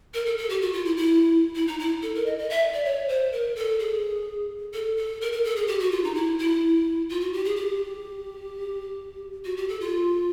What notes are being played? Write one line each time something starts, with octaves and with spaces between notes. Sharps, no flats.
A#4
A4
A4
G4
F#4
F4
E4
E4
E4
D#4
E4
A4
A#4
D#5
D#5
E5
D5
C#5
C5
A#4
A4
G#4
A4
A4
A#4
A#4
A4
G#4
G4
F#4
F4
D#4
E4
E4
F4
F#4
G4
G#4
G4
F#4
G4
A4
F4